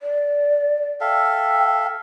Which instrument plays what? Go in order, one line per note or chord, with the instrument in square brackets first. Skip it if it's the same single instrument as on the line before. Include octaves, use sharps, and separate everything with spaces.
[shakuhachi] D5
[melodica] A4 E5 F5 [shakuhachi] G5